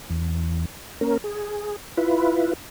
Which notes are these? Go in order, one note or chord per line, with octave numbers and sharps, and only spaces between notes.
E2
A#3 C#4 A#4
G#4
E4 F4 B4